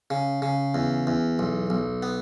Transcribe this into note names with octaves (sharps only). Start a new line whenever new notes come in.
C#3
C#3
E2
E2
B1
B1
B3